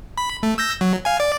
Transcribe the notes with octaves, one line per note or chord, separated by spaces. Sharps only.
B5
A3
E6 G6 A#6
F#3
F5 G#5
D5